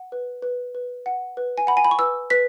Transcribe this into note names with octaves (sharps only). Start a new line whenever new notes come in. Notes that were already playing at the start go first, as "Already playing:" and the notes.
Already playing: F#5
B4
B4
B4
F#5
B4
G#5
F#5 B5
G#5
B5
C#6
B4 E6
B4 B6